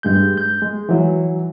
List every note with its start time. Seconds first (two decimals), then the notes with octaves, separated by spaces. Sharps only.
0.03 G2 G#3 G6
0.38 G6
0.62 G#3
0.89 E3 F#3